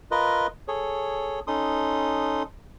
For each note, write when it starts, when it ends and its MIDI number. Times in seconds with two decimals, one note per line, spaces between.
0.11 0.47 65
0.11 0.47 70
0.11 0.47 71
0.11 0.47 75
0.68 1.40 68
0.68 1.40 69
0.68 1.40 73
1.47 2.43 61
1.47 2.43 63
1.47 2.43 69
1.47 2.43 84
1.47 2.43 87